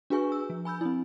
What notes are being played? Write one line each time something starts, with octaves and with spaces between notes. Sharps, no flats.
D4 F#4 G#4 B4 G#5 C#6
E6
F3
G#5 B5 E6 G6
C4 E4